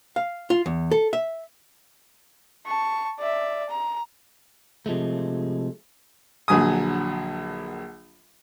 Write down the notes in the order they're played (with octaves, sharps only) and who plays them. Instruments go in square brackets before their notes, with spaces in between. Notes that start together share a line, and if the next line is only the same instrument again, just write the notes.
[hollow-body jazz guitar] F5
F4
E2
A4
E5
[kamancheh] A5 C#6
D5 E5
A#5
[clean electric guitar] C3 F3 G#3 A3
[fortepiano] A#1 D3 F#3 G#5 D#6